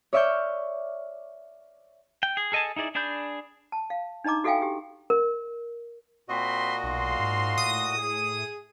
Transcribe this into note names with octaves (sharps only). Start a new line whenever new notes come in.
C#5 D5 E5 C#6 F6 G6
G5
G#4
G#4 A4 D#5 G#5 A5
D#4 E4 G#4 D5
D4 G#4 D5 B5 G6
A5
F5
D4 D#4 D#5 A#5 D6
F#4 A4 E5 F5 G5 G#5
G4
A#4
A#2 C4 F#4 D#5 B5 C6
B1 F5 C6
G#2
A2 D#6
G#4